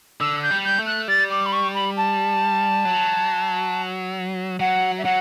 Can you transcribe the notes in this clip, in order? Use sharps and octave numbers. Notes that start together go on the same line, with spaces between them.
D3 E6
G6
G3
G6
A3
F#6
G3 A6
D6
B5
C#6
B5
A5
F#3
F#3 F#5
E5
F#3 F#5